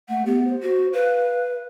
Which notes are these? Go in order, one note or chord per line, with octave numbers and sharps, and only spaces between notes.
A3 F#5
B3 G4
C5
F#4
B4 F5